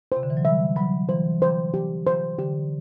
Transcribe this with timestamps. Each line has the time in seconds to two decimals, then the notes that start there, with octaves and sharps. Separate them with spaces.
0.12 C3 C5
0.23 D3
0.30 E3
0.37 F#3
0.45 G3 E5
0.76 F#3 B5
1.09 E3 C5
1.42 C5
1.74 G4
2.07 C5
2.39 D3 G4